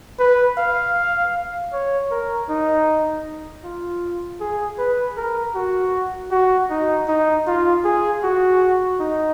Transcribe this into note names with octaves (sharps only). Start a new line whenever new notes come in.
B4
F5
C#5
A#4
D#4
F4
G#4
B4
A#4
F#4
F#4
D#4
D#4
F4
G#4
F#4
D#4